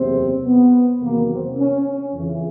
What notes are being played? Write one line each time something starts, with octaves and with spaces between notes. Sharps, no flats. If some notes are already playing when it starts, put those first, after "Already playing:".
Already playing: F#1 E2 C3 C4
B3
E2 C3 D#3 F#3 A#3
C4
C#4
C#4
F2 C#3 E3